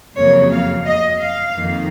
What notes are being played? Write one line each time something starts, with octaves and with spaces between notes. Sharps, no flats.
F2 C#3 F#3 A#3 C#5
F5
D#5
F5
F2 D#3 A#3